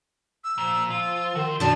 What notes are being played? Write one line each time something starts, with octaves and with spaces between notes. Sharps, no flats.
E6
A#2 F3
F4 E6
D#3 F#4 C5
B2 D#3 F3 D4 A5